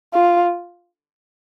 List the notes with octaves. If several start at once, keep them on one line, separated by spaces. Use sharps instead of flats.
F4